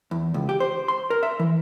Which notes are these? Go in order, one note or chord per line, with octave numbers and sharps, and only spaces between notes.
E2
C#2
G4
C5
C6
A#4
E5
E3